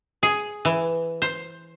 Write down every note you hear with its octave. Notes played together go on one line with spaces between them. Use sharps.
G#4
E3
C5